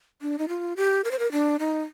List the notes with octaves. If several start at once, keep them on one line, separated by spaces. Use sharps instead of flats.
D4
D#4
F4
G4
A#4
C5
A#4
D4
D#4